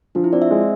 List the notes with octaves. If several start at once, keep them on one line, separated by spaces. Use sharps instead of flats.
F3 D4
E4
C4 D5
E5
G#3